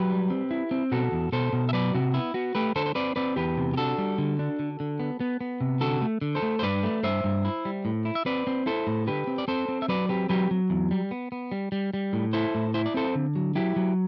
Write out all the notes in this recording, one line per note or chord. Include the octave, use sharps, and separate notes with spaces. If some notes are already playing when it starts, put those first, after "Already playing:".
Already playing: F#3 G4 B4
G3
C4
E4
C4
B2 F#4 A4
E2
B2 A4 C5
B2
E5
F#3 B4 D5
C3 F#4
B3 E4
B3 F#4
A3 G4 B4
D3 A4 C5
C5
C4 B4 D5
C4 B4 D5
E2 G4 B4
C3
G4
D4 F#4 A4
G3
D3
D4
D3
D3
B3
B3
B3
C3
D3 F#4 A4
A3
D3
A4 C5
A3
C5
G2 B4 D5
A3
G2 C5 E5
G2
E4
G3
A2
E4
E5
C4 B4 D5
C4
E4 A4 C5
A2
D3 G4 B4
C4
D5
C4 A4 C5
C4
E5
F#3 B4 D5
C4 G4 B4
F#3 G4 B4
F#3
E2
G3
B3
B3
G3
G3
G3
A2
E4 A4 C5
A2
E4 C5
D5
C4 A4 C5
D3
F#3
F#3 E4 G4
F#3